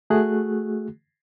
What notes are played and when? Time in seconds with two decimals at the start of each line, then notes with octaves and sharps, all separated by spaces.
0.10 A3 F#4 G#4 F#6